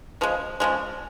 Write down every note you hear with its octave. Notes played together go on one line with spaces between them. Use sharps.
C#3 F3 G#3
C#3 F3 G#3